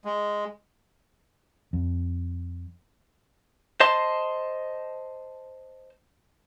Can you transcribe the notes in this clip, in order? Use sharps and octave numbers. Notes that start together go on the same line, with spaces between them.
G#3
F2
C5 D#5 A5 C6